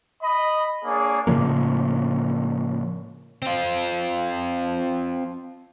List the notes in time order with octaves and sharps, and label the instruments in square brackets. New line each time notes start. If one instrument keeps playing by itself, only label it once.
[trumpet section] D#5 B5
A#3 D4 G#4 C#5
[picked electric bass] A2 C#3 F3 A#3
[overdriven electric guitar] C4 F4